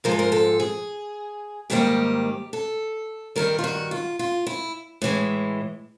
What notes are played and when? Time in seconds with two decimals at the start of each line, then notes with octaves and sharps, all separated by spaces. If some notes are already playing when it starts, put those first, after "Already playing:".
0.04 G#2 F3 G#3 A#4
0.11 A4
0.19 A#4
0.32 A4
0.60 G#4
1.70 G#2 D#3 G3 A#3 G4
2.53 A4
3.36 G2 D#3 G3 A#4
3.59 F4
3.64 F#4
3.91 F4
4.19 F4
4.47 E4
5.02 A2 E3 G#3